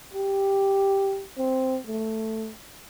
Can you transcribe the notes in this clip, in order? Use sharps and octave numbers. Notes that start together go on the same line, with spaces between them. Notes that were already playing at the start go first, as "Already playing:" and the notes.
G4
C4
A3